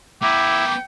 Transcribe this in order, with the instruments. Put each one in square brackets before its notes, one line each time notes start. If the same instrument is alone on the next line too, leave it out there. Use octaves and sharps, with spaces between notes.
[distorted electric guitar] B3 A#4 [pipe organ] E4 [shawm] G5 [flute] D6